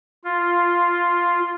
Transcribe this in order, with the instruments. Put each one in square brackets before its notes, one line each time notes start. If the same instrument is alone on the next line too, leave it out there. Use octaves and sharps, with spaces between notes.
[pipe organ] F4